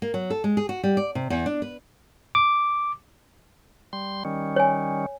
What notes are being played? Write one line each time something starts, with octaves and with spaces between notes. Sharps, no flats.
A#3
F#3
A4
G#3
G#4
F#4
G3
D5
C3
E2
D4
B4
D6
G3 C6
D#3 G3 C#4
C#5 G#5